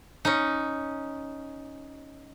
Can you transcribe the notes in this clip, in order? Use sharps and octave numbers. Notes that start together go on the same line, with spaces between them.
C#4 D#4